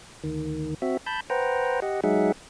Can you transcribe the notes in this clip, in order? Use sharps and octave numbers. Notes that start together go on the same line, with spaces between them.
D2 D#3
C4 F#4 E5
A5 B5 G6
B4 C5 F#5 G5 A#5
G4 D#5 F#5
F#3 G#3 D#4 G#4 E5 F#5